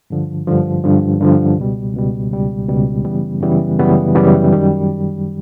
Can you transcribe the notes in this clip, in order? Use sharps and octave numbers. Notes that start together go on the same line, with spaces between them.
G2 D3 F3
G2 D3 F3
G2 D3 F3
G2 D3 F3
C#2 B2 G3
C#2 B2 G3
C#2 B2 G3
C#2 B2 G3
F#2 C#3 E3 G3 B3
F#2 C#3 E3 G3 B3
F#2 C#3 E3 G3 B3
F#2 C#3 E3 G3 B3
F#2 D#3 G3